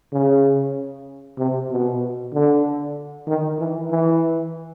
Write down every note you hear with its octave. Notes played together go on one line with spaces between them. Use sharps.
C#3
C3
B2
D3
D#3
E3
E3